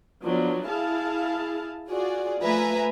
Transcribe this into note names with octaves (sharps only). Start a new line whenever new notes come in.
F3 F#3 B3 D4
E4 G#4 F5 A5
F4 F#4 G#4 D5
F3 A3 B4 E5 G#5 A#5